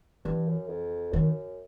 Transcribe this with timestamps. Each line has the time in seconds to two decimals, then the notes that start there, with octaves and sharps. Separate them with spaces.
0.25 G2 E3
0.48 F#2
0.69 F2
1.13 F#2 D#3